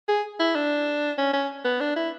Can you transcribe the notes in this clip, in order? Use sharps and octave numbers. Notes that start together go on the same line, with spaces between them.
G#4
E4
D4
C#4
C#4
B3
D4
E4